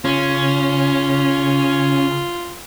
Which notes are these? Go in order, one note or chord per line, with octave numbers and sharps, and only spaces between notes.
C#3 C#4 F4